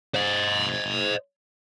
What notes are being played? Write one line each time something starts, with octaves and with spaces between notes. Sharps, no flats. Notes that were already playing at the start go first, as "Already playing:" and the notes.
C5 D#5